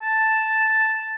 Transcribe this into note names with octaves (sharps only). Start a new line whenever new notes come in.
A5